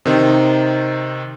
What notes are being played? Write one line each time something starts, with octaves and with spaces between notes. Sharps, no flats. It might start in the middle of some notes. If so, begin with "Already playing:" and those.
C3 D#3 C4 D#4